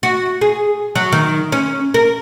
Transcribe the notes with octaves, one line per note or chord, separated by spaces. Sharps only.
F#4
G#4
F#3
D#3
C#4
A#4